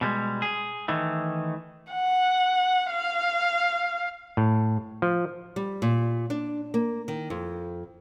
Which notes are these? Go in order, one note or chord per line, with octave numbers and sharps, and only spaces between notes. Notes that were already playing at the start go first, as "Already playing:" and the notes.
B2 G3 G#3
G#4
D#3 E3 A3
F#5
F5
A2
F3
G3
A#2
D4
A#3
D#3
F2